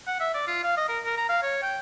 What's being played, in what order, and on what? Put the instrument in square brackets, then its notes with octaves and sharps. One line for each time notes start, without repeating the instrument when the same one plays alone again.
[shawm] F#5
E5
D5
F4
F5
D#5
A#4
A#4
A#5
F5
C#5
G5